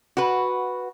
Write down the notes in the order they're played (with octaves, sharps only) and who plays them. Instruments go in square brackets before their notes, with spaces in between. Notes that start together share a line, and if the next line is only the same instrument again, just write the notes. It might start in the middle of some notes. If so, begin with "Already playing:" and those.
[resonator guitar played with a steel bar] F#4 B4